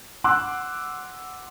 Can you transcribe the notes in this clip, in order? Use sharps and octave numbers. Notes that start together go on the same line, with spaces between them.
F#5 C6 D6 E6 F#6